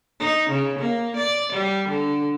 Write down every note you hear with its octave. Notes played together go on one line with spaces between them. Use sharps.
D#4
C#3
A#3
D5
G3
D3